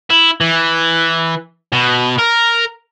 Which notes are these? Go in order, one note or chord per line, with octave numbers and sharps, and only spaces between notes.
E4
E3
B2
A#4